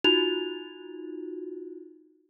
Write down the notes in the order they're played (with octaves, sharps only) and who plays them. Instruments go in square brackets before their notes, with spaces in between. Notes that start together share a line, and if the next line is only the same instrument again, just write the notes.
[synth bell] D#4 F4 F#4 [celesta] F7